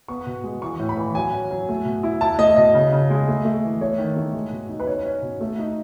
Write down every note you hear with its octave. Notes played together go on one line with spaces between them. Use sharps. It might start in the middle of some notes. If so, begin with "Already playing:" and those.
B3 C#6
B2
G#3
E3 C#6
A2
B5
E3
F#3 G#5
C#4
F#3
A3
B2
E4
E4 A5
A3 D#5
B2 D#5
C#3
C#3
G#3
A3
A3
E3
A3 C#5
D#3
A3
G#3
B2
D#4
B4
C#4 C#5
C#4
B2
A3
D#4